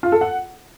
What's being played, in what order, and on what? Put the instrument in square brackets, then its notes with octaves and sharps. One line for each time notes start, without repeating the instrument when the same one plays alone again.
[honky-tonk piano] F4
A4
F#5